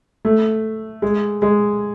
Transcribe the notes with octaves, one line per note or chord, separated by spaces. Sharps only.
A3
G#3
G#3